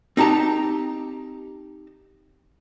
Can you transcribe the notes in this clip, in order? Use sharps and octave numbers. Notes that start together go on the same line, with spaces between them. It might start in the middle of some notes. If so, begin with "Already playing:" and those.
C4 D#4 G4 A5 A#5